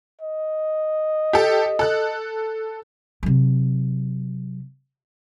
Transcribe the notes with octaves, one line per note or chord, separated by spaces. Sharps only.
D#5
G4 A4
A4 F#6
C3 F#3